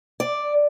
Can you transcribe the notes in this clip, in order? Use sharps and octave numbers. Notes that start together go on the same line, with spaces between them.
D5